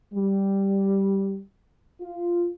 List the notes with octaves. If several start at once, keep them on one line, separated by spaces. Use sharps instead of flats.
G3
F4